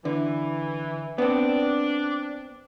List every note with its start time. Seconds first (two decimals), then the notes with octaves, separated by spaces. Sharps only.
0.05 D3 E3
1.18 B3 C4 D4